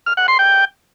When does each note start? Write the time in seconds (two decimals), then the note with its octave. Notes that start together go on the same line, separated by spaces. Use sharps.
0.06 F6
0.17 F#5
0.28 C6
0.39 G5